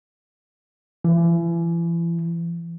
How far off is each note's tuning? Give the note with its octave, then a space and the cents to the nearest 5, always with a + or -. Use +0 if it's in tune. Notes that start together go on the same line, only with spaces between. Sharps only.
E3 +35